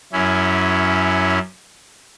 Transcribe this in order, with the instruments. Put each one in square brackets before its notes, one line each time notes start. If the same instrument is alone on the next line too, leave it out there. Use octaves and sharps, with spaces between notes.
[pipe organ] F#2 C#4 E4